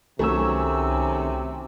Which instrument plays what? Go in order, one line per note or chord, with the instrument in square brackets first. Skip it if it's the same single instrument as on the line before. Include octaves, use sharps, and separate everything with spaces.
[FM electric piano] C2 G#5 E6 [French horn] C3 [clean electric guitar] D#3 C#4 [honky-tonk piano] F#3 A3